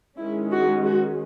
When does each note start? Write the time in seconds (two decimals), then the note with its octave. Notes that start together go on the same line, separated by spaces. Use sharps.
0.18 D#3 G#3 C#4 E4
0.51 F#4
0.85 F#4